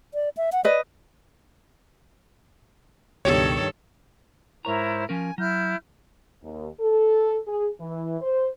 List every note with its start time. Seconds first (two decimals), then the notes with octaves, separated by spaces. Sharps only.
0.14 D5
0.37 E5
0.52 F#5
0.65 B4 D5 D#5
3.25 C#2 G2 B2 D#3 G4 A4 C#5
4.65 G#2 E4 A#4 C5 C#5 A#5
5.09 F3 C#4 A#4 G#5
5.38 F#3 E4 F6 G6
6.41 D#2
6.80 A4
7.46 G#4
7.79 E3
8.21 C5